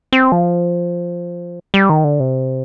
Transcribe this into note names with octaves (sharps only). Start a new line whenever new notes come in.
C4
F3
G3
D#3
D3
C3